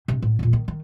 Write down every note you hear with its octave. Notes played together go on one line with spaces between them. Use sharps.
C3 D4
A2
E2 A#2
D#3
D#3